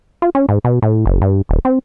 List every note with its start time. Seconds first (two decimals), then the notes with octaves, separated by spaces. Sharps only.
0.22 F4
0.35 C#4
0.49 G#2
0.64 B2
0.82 A2
1.06 F#1
1.21 G2
1.49 D#1
1.65 C4